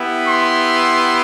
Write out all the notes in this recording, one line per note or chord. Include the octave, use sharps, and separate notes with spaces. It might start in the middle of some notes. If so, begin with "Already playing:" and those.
Already playing: B3 E4 G4
C6